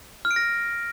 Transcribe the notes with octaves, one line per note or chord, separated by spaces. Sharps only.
F6
D7
A#6